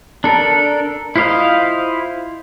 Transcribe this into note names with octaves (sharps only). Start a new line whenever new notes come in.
D4 A4 A#4
E4 F4 C5 D#5 F5